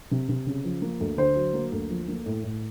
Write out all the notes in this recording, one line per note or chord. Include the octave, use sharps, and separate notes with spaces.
C3
C3
C#3
F3
A#3
D2
D3 C5
F#3
A#3
D2
F3
A#3
A2
A2